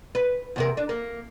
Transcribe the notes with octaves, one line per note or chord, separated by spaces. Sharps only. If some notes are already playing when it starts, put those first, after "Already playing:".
B4
E2 C3 A#4
D4
A#3